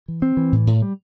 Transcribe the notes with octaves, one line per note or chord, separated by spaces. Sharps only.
E3
C4
E3
A2
A2
G3